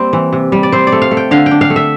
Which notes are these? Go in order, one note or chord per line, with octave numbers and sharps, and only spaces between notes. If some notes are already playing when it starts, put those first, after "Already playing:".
Already playing: G3 A#3 C4
E3
C3
G3
D5
C4 C5
D5
A3
F5
A3
G5
D3 F5
G5
D4
F5
A3
E5